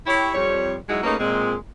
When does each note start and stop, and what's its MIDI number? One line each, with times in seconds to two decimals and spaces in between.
0.07 0.31 64
0.07 0.31 67
0.07 0.31 73
0.35 0.74 41
0.35 0.74 55
0.35 0.74 73
0.89 1.02 54
0.89 1.02 56
0.89 1.02 63
0.89 1.02 64
0.89 1.02 66
1.04 1.14 57
1.04 1.14 58
1.04 1.14 61
1.04 1.14 63
1.04 1.14 68
1.04 1.14 71
1.20 1.55 46
1.20 1.55 56
1.20 1.55 60